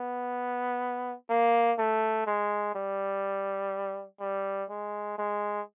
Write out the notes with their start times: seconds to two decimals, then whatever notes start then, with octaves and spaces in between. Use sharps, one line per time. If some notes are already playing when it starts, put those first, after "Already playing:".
Already playing: B3
1.30 A#3
1.79 A3
2.27 G#3
2.75 G3
4.21 G3
4.70 G#3
5.18 G#3